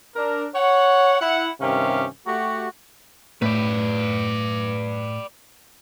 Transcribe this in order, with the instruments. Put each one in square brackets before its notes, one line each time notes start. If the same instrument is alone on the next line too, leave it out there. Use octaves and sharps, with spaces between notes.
[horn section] D4 A#4
C#5 F#5
E4 F#5
G2 C3 D#3 C#4 G4 F5
A3 F#4 G4
[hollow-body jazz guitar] A2 [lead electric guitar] B4 D5